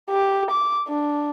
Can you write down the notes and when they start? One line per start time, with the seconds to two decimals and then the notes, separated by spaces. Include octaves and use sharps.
0.10 G4
0.51 D6
0.88 D4